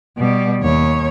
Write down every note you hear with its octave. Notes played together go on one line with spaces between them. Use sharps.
B2 G3
D#2 C#5